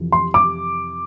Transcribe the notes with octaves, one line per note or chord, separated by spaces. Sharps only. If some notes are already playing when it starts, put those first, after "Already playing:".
Already playing: F2 C3 E3
C6
D6